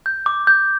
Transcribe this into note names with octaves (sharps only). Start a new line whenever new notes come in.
G6
D6
G6